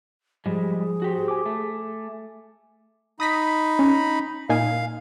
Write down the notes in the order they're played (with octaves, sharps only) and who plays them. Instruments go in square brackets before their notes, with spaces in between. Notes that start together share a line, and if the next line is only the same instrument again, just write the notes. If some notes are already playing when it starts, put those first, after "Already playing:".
[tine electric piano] G#2 F3 [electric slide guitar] G3 G#3 [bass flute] G#4
[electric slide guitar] F#4 G4 C5
[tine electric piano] G#5 D6
[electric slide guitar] A3
[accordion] D#4 B5 [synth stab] D#6 A#6 B6
[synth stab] C#4
[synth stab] A#2 D#4 G#5 [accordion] F5